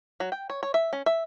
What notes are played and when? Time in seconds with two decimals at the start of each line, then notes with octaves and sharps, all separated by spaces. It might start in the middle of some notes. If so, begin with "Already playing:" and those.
0.20 F#3
0.32 G5
0.50 C#5
0.63 C#5
0.74 E5
0.93 C#4
1.06 E5